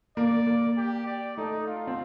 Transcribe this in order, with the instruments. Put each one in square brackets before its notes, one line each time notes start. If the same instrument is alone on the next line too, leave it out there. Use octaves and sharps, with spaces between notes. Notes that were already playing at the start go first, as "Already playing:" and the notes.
[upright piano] A#3 [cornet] D5
[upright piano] A#3
[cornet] G4
D5
[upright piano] A3 [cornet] D#4
[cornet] F4
[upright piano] C4